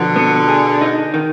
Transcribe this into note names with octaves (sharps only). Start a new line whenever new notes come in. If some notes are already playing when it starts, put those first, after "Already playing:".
Already playing: B2 D3 F3
B3
G#4
D#4
D#3